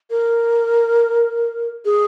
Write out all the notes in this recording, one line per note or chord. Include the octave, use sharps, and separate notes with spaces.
A#4
G#4